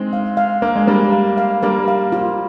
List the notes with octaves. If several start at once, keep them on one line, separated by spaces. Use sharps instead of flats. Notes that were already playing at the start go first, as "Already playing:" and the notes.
Already playing: G#3 C4 D#4
F5
F5
A#3 F5
G#3
G3 A#3 A#4
F5
F5
G3 A#3 A#4
F5
F4